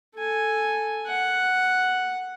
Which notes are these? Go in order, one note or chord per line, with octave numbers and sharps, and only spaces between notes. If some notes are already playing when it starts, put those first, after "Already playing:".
A4 G#5
F#5